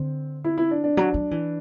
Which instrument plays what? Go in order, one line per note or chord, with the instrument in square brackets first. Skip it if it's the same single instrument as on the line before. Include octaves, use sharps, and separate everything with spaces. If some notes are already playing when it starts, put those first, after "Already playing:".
Already playing: [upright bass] D3 [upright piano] C4
[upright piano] E4
E4
D4
D4
[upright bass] F#3 [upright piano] D4
[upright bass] F#3
E3